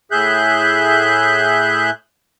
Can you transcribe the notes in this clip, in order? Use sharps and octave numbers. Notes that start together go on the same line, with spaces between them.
A2 G#4 E5 F#6 G6